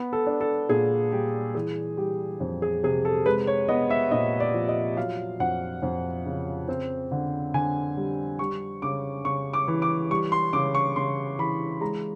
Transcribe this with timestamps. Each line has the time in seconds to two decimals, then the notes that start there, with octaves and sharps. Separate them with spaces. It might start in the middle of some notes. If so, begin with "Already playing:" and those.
Already playing: B3
0.13 A4
0.27 D4
0.41 A4
0.69 A#2 G#4
1.12 G3 G4
1.55 E3 G#4
1.97 G3 G4
2.40 F2
2.62 G#4
2.83 C3 G#4
3.05 A4
3.26 G#3 B4
3.47 C#5
3.68 B3 D#5
3.90 E5
4.11 A#2 D#5
4.40 D5
4.54 F3
4.68 D#5
4.97 F#3 F5
5.40 F2 F#5
5.83 F2
6.26 C#3
6.68 C4
7.11 D3
7.54 D3 G#5
7.97 G3
8.39 G3 C#6
8.82 C#3 D6
9.24 C#3 C#6
9.53 D6
9.68 E3
9.82 D6
10.11 G3 C#6
10.32 C6
10.53 C#3 D6
10.75 C#6
10.96 C#3 C6
11.39 E3 B5
11.81 G#3 A#5